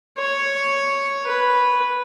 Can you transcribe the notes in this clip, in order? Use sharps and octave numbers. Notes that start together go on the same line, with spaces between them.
C#5
B4